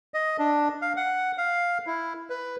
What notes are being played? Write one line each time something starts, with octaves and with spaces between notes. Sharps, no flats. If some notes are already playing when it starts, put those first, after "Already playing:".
D#5
D4
F5
F#5
F5
E4
B4